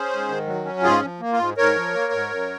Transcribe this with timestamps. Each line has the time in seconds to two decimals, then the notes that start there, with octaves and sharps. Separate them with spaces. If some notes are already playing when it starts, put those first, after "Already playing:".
Already playing: C#4 G#4 C5
0.10 G#2
0.28 D#3
0.47 F#3
0.65 C#4
0.83 G#2 F4 G#4
1.02 F3
1.20 A#3
1.33 F4
1.39 G#2
1.57 G#2 A#4 C#5
1.76 F3
1.94 A#3
2.12 G#2
2.30 F#2